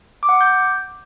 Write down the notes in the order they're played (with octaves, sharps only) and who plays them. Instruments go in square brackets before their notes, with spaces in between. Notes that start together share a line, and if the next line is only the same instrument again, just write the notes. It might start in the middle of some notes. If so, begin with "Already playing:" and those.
[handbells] D6
F#5
D6
G6